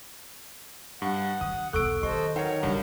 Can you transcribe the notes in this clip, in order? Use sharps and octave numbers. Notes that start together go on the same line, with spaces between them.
G2 F#5
D#3 D4 D#6
B1 E2 A4 C#6 E6 F#6 D7
D#3 G4 A4 C5 D#5 C#6
F#3 D#4 A#4 B4 C#5 F#5 G5
G2 C#3 E3